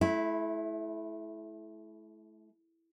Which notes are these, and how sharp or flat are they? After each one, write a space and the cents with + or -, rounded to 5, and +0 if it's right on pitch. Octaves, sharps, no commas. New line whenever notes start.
A3 -35 E4 +0